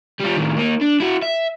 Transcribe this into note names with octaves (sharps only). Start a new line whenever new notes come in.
G3 F4
A2 D#3
A#3 D#4
D4
E4 F#4
E5